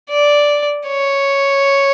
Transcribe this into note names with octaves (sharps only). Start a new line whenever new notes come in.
D5
C#5